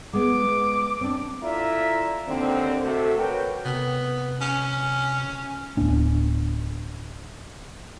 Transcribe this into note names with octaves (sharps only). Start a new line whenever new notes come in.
G#3 B3 D6
C4 D4
E4 F4 A4 D5 E5 A#5
D#2 D3 C4
C3 A3 F#4 A4
F#4 A#4 B4 C#5 G5
C3 B3
C#4
D1 B3 D4